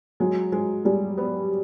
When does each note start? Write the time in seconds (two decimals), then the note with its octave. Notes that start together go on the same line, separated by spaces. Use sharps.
0.20 F#3 G#3
0.52 G#3
0.85 G3 G#3
1.18 B3